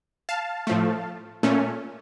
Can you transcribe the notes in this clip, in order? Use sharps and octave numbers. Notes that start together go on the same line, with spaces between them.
F5 A5
A2 F3 A3
A#2 A3 C#4